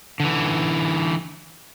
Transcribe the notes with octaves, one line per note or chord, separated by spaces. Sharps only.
D3 E3